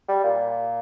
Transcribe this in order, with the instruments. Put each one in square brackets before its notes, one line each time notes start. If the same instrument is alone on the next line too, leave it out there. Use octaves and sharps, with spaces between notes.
[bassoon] G3
A#2